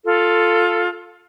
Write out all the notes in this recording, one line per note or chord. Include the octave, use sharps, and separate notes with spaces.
F4 A4